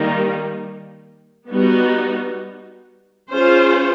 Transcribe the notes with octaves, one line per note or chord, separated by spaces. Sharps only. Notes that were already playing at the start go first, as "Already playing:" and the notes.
Already playing: D#3 G3 A#3 D#4
G3 B3 D#4 F#4
C#4 F4 G#4 C5